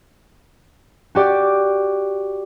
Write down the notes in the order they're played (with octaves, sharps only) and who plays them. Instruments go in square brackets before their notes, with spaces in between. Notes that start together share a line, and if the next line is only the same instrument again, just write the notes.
[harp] F#4 G4 D5